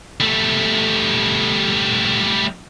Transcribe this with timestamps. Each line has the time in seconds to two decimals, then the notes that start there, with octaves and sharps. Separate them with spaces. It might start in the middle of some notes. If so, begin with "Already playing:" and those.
0.20 G3 A3